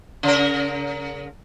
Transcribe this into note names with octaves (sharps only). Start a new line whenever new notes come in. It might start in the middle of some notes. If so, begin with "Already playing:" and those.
C#3 A#4